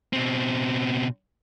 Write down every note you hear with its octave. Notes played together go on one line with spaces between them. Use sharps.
B2 C4